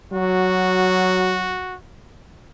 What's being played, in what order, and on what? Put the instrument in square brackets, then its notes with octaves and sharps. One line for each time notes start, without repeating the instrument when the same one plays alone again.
[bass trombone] F#3 [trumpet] F#4